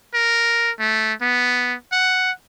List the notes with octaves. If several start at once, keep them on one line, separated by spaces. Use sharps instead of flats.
A#4
A3
B3
F#5